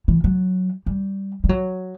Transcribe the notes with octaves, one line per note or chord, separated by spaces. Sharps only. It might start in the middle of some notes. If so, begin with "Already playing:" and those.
E3
F#3
G3
G3
F#3